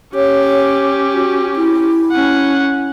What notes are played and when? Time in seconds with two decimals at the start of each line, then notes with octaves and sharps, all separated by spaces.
0.15 C#4 G4 C#5
1.13 F#4
1.56 E4
2.12 C#4 F#5